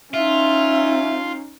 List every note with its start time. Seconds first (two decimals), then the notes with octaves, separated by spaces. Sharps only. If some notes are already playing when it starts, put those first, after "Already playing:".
0.14 C#4 D#4 F4 E5